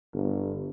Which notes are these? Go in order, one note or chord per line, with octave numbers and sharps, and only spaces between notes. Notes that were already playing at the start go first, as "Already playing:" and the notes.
G1